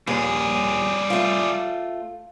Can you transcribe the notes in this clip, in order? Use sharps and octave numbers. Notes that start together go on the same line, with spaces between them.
D#2 A#2 G3 G#4
A3 F4